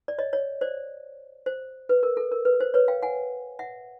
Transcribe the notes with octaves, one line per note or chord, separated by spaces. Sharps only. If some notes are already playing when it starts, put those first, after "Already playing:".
D5
C#5 D#5
C#5 D#5
C5 D5
C5
B4
A#4
A4
A#4
B4
C5
B4 C#5
F5 G5
F#5 G#5
E5 F#5